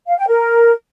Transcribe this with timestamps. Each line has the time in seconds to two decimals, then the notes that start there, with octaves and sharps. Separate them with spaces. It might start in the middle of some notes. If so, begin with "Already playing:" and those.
0.07 F5
0.18 G5
0.28 A#4